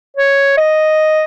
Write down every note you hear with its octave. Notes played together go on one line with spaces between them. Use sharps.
C#5
D#5